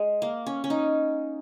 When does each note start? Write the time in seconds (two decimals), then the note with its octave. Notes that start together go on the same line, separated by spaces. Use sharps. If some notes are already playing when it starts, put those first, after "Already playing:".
Already playing: G#3
0.22 A#3
0.46 C#4
0.64 C#4
0.70 D#4